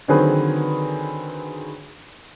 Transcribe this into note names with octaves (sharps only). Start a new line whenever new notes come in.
D3 D#3 F#3 C4 G#4 B4